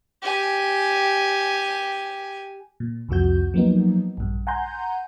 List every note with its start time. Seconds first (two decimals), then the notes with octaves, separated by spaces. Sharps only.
0.22 G4 G#5
2.80 A#2
3.09 C2 F2 F3 F#4 G6
3.54 F3 F#3 A#3 B3 D#4
4.17 A#1 G2
4.47 F#5 G#5 A#5 C6 G6